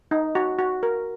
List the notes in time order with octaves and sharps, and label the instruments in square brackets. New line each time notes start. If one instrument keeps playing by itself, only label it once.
[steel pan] D#4
F#4
F#4
A#4